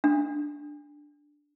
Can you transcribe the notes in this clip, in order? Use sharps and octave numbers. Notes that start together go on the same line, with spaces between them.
D4